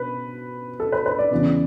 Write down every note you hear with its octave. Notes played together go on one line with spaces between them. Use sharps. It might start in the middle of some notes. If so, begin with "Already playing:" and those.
Already playing: B2 B4
A4
B4
B4
D5
E2 C#3 E3 B3